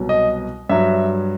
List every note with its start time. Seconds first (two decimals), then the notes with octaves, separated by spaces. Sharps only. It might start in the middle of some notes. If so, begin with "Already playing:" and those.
Already playing: C2 B2 F#3
0.09 D#5
0.69 G2 F#3 E5